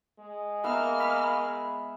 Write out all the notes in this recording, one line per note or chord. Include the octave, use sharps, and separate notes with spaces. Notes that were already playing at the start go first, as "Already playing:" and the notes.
G#3
A#3 B3 E5 F5 F6
B5